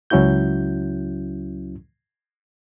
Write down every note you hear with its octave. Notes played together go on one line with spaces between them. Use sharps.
C#2 F#3 C#4 E4 F#4 G6